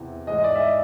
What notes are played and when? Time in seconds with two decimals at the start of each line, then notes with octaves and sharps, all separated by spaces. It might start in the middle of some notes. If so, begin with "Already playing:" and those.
Already playing: E2 C3 E3
0.27 G#2 E3 G#3 D#5
0.38 D#5
0.44 D5
0.55 E5
0.60 D#5